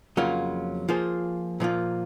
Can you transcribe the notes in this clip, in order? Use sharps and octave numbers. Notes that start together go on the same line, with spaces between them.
F2 C#3 F#3 A#3 F4
F3 A#3 F4 G#4 C5
A#2 F3 A#3 F4